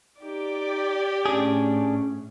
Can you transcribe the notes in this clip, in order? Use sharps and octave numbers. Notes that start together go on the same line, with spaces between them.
D#4 G4 D5
A2 C#4 D4 G#4